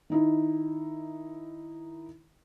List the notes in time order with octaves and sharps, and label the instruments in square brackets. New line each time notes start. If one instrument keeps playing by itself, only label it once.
[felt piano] D#3 D#4 E4